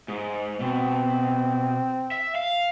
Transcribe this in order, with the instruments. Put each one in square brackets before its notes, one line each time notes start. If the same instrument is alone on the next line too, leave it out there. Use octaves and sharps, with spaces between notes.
[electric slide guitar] G#2
[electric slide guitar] B2 [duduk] C4
[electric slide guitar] E5
F5